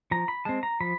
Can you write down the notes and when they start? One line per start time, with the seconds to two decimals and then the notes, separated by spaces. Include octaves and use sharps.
0.11 F3 A#5
0.28 B5
0.45 G#3 C4 A5
0.63 A#5
0.80 F3 B5